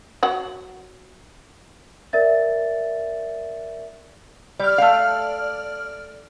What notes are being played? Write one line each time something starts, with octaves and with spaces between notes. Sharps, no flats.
F#3 F#5
A#4 D5 E5 A6
G3 D5 F6
A3 F5